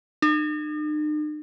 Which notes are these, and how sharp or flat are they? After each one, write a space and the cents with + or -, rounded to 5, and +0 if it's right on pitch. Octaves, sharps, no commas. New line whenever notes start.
D#4 -45